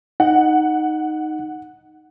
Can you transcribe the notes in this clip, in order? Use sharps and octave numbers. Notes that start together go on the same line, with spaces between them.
D#4 F#5